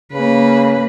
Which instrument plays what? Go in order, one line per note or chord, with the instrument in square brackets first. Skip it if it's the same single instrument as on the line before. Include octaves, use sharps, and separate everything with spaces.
[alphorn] C#3 [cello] A#3 B4